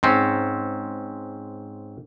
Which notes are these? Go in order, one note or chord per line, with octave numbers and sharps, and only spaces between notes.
G#2 C4 C#4